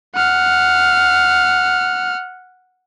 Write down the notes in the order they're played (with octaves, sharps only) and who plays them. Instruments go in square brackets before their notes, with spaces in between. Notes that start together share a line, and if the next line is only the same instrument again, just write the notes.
[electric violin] F#5 F6